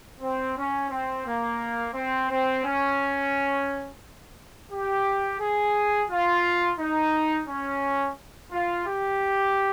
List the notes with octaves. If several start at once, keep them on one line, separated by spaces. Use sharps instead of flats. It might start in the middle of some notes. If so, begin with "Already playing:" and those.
C4
C#4
C4
A#3
C4
C4
C#4
G4
G#4
F4
D#4
C#4
F4
G4